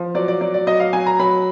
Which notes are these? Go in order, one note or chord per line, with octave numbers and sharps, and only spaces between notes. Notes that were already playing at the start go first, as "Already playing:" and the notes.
Already playing: F3
F#3 D5
D5
F#3 D5
D5
F#3 D#5
F5
F#3 G#5
A#5
F#3 B5